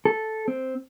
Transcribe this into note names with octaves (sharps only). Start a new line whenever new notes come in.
A4
C4